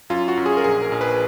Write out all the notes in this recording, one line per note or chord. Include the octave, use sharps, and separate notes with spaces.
F#2 F4
F#4
F#2
G#4
A#4
A#1 G#4
A#4
A#1
B4